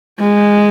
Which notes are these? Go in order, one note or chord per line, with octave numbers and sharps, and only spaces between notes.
G#3